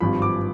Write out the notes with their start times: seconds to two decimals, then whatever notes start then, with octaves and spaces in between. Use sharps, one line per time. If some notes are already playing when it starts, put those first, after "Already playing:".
0.01 G#1 G2 F3 B5
0.22 D6